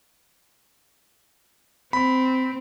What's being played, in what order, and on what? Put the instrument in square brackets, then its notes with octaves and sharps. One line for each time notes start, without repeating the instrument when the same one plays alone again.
[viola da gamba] C4 [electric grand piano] B5